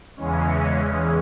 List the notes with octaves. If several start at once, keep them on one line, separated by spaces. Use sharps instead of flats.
E2 C#3 E3 G#3 C#4